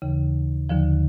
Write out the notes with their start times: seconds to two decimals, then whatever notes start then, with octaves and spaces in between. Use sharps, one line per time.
0.02 D#2 C#3 E3
0.69 D#2 D3 F3